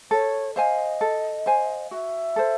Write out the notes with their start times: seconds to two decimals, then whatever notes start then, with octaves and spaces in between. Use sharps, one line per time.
0.11 A4 C#5
0.56 C5 D#5 F5 G#5
1.01 A4
1.46 C5 F5 G#5
1.91 F#4 E5
2.36 A4 C5